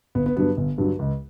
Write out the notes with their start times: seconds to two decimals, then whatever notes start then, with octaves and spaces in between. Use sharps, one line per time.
0.15 G1 B3
0.26 B3
0.36 G2 D3 F#3 B3
0.57 G1
0.78 G2 D3 F#3
0.99 C#2